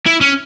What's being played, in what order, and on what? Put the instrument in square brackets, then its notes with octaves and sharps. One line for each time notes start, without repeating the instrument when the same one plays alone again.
[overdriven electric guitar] E4
C#4